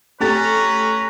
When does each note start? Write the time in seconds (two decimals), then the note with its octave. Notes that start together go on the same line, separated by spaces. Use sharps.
0.20 A3 C#4 G4 B4 A#5 A6